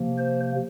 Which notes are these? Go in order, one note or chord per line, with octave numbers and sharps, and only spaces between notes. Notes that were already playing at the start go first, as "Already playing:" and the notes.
Already playing: C3 F3 A#3
C5